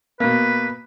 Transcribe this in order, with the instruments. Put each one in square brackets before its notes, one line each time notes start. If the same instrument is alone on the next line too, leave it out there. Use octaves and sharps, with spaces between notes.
[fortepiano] B2 A#3 [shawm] B4